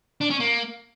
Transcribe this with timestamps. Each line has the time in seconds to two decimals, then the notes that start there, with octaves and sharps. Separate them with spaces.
0.21 D4
0.30 C#4
0.40 A#3